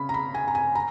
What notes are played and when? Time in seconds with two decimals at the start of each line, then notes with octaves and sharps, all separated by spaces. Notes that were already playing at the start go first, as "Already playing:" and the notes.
Already playing: C#3 B5
0.09 A#5
0.14 B5
0.35 G#5
0.48 A#5
0.55 G#5
0.75 A#5